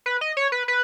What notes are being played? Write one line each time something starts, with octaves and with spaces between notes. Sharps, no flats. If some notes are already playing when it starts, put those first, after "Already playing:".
B4
D#5
C#5
B4
B4